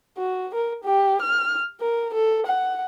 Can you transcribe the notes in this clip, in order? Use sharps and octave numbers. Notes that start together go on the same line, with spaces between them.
F#4
A#4
G4
F6
A#4
A4
F#5